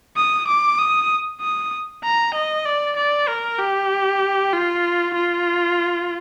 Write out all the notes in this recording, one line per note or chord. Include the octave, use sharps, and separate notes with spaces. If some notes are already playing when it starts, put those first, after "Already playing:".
D#6
D6
D#6
D#6
A#5
D#5
D5
D5
A#4
G4
F4
F4